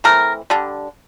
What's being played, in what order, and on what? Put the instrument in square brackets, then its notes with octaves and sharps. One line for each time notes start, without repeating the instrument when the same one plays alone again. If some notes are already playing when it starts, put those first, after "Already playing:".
[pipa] E3 A3 C4 A#4
D3 G3 D4